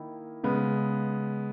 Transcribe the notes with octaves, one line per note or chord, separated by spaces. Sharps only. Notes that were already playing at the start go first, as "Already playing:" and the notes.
Already playing: D#3 A#3 E4
C#3 G#3 B3